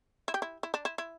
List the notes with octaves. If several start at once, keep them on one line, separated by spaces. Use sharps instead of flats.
E4
G4
E4
E4
D4
E4
E4